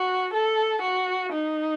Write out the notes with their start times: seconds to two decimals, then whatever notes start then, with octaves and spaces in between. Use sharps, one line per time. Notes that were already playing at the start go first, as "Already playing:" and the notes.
Already playing: F#4
0.33 A4
0.82 F#4
1.32 D#4